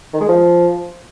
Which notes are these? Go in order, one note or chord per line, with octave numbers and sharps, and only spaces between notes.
D#3
G#3
F3